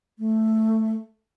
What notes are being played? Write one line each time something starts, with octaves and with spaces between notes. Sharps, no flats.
A3